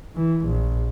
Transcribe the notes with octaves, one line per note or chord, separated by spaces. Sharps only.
E3
A#1